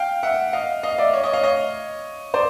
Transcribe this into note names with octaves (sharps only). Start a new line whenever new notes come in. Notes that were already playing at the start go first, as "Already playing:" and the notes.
Already playing: F5 G5
E5 F#5
D#5 F5
D#5 F5
D5 E5
C#5 D#5
C#5 D#5
D#5 F5
C#5 D#5
C5 D5